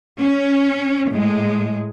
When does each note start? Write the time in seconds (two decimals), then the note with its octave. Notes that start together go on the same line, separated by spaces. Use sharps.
0.20 C#4
1.10 A2 G#3